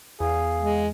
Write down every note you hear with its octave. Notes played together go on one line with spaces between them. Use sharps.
E2 G#4 F5
G#3